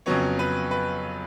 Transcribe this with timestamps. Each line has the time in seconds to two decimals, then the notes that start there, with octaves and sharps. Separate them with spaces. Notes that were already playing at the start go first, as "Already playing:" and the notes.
0.06 F2 C#3 F#3 B3 C#5
0.39 B4
0.71 B4